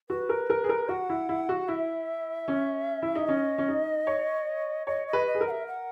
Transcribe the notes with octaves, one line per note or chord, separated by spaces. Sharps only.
F#4 B4
A#4
A#4
G#4
A#4
F#4 F#5
E4
E4
F#4
E4 E5
C#4
E4
D#4
C#4 D#5
C#4
D#4
C#5
C#5 D#5
D#5
B4
D#5
G#4
A#4
F#5
E5
F#5